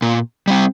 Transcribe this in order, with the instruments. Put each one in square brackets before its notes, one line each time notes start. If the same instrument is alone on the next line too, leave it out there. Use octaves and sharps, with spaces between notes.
[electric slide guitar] A#2
G3 C4